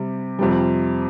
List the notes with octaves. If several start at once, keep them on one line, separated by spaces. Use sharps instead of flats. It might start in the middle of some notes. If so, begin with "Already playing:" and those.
Already playing: C3 G3
F2 C3 G3